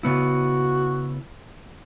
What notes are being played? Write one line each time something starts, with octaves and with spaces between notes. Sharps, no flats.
C#3 B3 E4 F#4